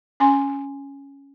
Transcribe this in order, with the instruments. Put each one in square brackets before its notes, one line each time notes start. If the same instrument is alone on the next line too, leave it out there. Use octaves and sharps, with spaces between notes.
[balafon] C#4 G#5 C6